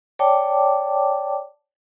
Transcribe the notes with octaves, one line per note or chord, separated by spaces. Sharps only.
C#5 D5 G5 A5 D6